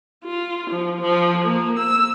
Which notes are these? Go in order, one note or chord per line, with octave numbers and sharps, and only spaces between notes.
F4
F3
F3
A#3
E6